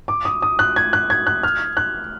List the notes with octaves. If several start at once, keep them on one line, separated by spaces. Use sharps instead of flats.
D6
D#6
D#6
F#6
G#6
F#6
G#6
F#6
F6
F#6